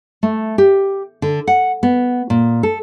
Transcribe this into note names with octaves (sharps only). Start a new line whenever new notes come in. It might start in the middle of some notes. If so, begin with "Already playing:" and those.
A3
G4
D3
F#5
B3
A#2
A4